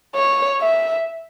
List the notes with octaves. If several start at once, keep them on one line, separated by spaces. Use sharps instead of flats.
C#5
E5